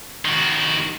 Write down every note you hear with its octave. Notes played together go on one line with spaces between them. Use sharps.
D#3 F#4